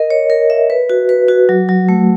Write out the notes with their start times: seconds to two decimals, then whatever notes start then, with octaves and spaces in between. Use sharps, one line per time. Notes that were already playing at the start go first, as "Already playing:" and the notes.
Already playing: A#4 D#5
0.10 C#5
0.30 A#4
0.50 E5
0.70 B4
0.90 F#4
1.09 B4
1.28 F#4
1.49 F#3
1.69 F#3
1.89 A3